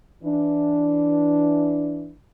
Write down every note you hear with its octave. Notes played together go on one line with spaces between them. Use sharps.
E3 D4